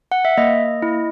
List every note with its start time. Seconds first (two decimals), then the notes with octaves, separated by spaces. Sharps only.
0.12 F#5
0.25 E5
0.37 A#3 D#5
0.82 E4